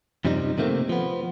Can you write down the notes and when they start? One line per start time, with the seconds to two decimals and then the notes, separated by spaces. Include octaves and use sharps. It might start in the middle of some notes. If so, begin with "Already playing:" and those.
0.25 F#2 C3 F3 G3 D4 D#4
0.58 C3 D#3 A3 A#3 C4
0.89 F3 B3